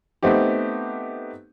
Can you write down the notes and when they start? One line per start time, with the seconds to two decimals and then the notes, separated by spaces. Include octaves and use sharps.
0.23 A3 B3 C4 D#4 G4